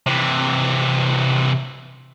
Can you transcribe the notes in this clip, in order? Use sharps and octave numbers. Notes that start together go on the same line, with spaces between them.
C3 E3